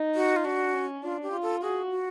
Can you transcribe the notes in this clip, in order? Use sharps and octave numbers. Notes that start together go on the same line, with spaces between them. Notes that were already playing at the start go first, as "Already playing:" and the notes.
Already playing: D#4
F#4
F4
D4 F#4
C#4
D4 F4
G4
F4
A4
F#4 G#4
F#4